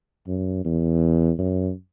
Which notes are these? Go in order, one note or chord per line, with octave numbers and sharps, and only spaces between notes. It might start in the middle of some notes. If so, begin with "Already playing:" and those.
F#2
E2
F#2